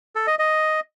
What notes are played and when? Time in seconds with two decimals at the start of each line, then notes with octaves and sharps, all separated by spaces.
0.16 A4
0.27 D#5
0.39 D#5